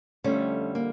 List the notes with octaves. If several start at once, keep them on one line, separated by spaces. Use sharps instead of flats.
F2 D3 G3 A3 C#4
A#3